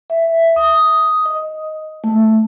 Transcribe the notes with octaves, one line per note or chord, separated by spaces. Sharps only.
E5
D#6
D#5
A3